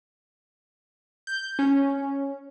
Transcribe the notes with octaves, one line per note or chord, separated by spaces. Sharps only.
G6
C#4